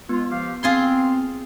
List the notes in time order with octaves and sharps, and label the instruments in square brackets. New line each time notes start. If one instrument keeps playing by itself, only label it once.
[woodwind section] G#3 F4 [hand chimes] B3
[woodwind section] F3 G4 F5
[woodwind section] C4 [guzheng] F4 G#4 C6